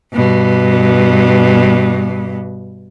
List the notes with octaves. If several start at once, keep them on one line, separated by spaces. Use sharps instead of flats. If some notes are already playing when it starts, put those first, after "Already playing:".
G2 B2